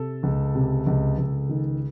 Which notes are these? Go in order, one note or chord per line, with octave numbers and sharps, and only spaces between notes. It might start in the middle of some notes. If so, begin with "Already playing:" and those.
Already playing: C3 A4
C#2
C3
C#2
C#2
D#3